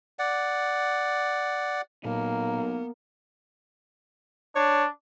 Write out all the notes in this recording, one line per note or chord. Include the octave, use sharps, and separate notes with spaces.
D5 F#5
B1 A#2 A#3 B3
D4 C#5